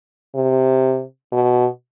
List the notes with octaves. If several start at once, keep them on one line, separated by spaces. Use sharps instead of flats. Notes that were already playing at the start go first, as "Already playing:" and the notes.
C3
B2